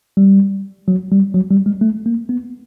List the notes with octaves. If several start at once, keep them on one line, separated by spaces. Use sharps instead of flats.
G3
F#3
G3
F#3
G3
G#3
A3
A#3
B3